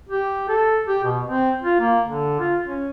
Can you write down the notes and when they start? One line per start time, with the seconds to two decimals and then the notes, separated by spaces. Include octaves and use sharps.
0.09 G4
0.49 A4
0.88 G4
1.04 B2
1.26 C4
1.63 F4
1.81 A#3
2.07 D3
2.40 F4
2.67 C#4